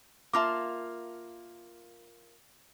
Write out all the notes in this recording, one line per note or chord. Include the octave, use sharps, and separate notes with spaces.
A#3 F4 E5 A5 D6